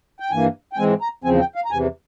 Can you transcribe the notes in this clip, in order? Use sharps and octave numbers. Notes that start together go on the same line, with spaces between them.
G5
G2 E3 A#3 G#5
G5
G#2 E3 G#3 C4 G#5
A#5
E2 C#3 F3 C4 G#5
G5
F5
A#5
E2 C3 E3 G#5